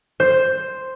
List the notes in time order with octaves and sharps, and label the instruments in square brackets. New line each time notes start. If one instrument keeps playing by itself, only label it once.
[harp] C5